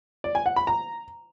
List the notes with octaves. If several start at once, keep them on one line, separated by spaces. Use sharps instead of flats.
D5
G#5
F#5
B5
A#5